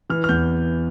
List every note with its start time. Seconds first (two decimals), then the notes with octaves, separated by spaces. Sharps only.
0.10 E3 F6
0.24 F6
0.29 E2 G6